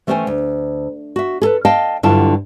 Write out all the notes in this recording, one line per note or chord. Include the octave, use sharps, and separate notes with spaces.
E3 A3 C#4 C5 G5 G#5
D2
F#4 E5
G#4 A4 B4
D#5 F5 G5 A5
G2 D3 F#3 E4 F4 A5